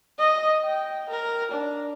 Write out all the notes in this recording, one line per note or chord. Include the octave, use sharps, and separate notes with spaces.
D#5
G5
A#4
D4